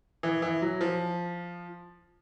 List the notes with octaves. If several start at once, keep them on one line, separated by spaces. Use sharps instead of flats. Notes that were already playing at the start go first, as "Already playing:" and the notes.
E3
E3
F#3
F3